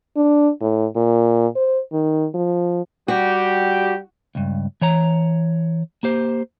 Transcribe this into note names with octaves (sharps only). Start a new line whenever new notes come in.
D4
A2
A#2
C5
D#3
F3
G3 F#4 G4
C#2 G2
E3 C#5 A#5
A#3 G4 C5